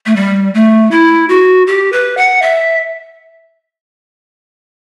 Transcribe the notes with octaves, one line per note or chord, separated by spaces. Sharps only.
A3
G3
A3
E4
F#4
G4
B4
F#5
E5